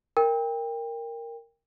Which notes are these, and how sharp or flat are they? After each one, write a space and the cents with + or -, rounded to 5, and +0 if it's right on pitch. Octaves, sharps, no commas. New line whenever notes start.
A#4 -5 G5 +25